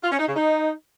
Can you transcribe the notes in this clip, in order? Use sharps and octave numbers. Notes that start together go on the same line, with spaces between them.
F4
C#4
D#4
C#3
D#4